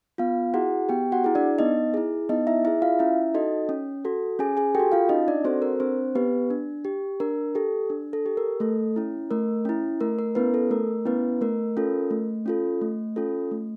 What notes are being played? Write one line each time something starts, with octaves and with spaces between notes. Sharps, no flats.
B3 F4 F5
E4 F#4 G#4 F#5
B3 G4 G5
F#4 F#5
E4 G#4
D4 D5
B3 D#4 D#5
E4 G#4
B3 D#4 D#5
E4 E5
E4 G#4 E5
F4 F5
C#4 E4 E5
D#4 F#4 A4 D#5
C#4
F#4 A4
C#4 G#4 G#5
G#4 G#5
F#4 G4 A4 G5
F4 F5
C#4 D#4 D#5
D4 D5
C4 F#4 A4 C5
A#4
C4 D4 C5
B3 G4 B4
D4
G4
D4 A#4
G4 A4
D4
A4
G4
A#4
A3 A4
C#4 E4
A3 A#4
C#4 E4
A3 A#4
A#4
B3 C#4 E4 B4
A4
A3 A#4
B3 C#4 E4 B4
A3 A#4
C#4 F4 A4
A3
C#4 F4 A4
A3
C#4 F4 A4
A3